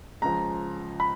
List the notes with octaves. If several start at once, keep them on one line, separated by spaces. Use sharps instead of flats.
C#2 C#3 F3 A#5
B5